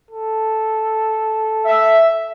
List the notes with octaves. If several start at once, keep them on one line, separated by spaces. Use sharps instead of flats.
A4
E5